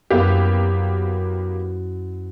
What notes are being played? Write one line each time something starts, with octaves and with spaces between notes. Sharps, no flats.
F#2 A#3 B3 E4 G4 B4